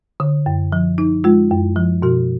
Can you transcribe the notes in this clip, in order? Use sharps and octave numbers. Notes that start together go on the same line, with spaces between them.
D3
F#2
F3
D#4
G#3 F4
F#2
F3
B2 F#4